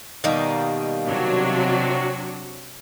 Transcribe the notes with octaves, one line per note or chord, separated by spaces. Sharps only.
B2 D#3 G3 A#3 D#4
C3 F#3 D4 F#4 C#5